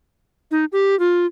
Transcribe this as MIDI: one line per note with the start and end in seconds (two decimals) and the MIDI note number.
0.51 0.65 63
0.72 0.98 67
0.99 1.26 65